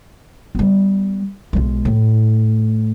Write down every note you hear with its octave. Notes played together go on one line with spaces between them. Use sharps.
G3 B3
B1 G#3
A2